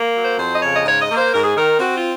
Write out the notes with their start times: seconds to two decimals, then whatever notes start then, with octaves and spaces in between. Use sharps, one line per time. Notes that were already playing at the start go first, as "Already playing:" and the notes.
Already playing: A#3
0.15 F#3
0.22 C5
0.39 F2 C5
0.53 D#5
0.62 C#3 C#5
0.75 D#5
0.85 G#2 C#5
1.01 D#5
1.09 A#3
1.16 C5
1.33 G#2 A#4
1.44 G#4
1.56 D#3 A#4
1.79 C4 F#4
1.96 F4